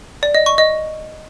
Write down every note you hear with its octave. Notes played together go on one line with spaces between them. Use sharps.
D5
D#5
C#6
D#5